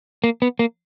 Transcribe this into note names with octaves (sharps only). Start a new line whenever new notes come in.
A#3
B3
A#3